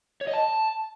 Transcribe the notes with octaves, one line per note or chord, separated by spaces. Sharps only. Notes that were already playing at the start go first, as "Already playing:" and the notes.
C#5
D#5
A5